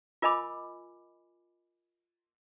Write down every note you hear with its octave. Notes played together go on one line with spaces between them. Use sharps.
F4 A#4 D#5 G#5 B5 D6